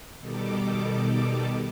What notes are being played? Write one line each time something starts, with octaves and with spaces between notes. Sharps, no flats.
B2 D#3 G3 D#4 A4 D6